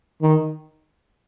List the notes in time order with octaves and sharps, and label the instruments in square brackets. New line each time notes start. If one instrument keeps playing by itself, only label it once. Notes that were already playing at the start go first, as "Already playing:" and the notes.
[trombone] D#3